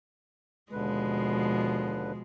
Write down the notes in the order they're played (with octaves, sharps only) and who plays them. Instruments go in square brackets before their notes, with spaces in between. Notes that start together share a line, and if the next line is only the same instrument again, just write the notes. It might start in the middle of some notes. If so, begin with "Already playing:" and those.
[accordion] D#2 D3 B4 [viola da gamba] B2 F3 G#3